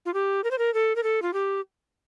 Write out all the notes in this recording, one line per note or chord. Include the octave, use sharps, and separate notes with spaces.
F4
G4
A#4
C5
A#4
A4
A#4
A4
F4
G4